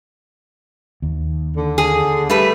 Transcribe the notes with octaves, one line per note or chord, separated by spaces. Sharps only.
D#2
D3
G#4
G3 A3 B4